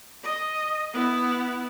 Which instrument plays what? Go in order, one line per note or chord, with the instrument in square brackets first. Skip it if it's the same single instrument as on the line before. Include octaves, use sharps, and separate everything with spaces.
[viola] D#5
B3 E4